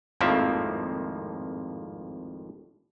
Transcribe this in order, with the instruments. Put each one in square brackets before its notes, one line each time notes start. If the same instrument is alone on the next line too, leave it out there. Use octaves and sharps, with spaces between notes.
[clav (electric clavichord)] G#1 F2 A2 F3 A#3 E5